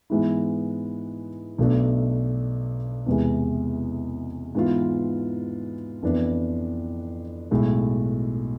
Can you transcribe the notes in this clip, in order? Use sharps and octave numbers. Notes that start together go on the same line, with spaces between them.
G#2 E3 G#3 B3 E4
B1 B2 A3 D4
E2 C3 E3 G#3
G#2 E3 B3 F4
F2 E3 B3 D4
B1 A2 G#3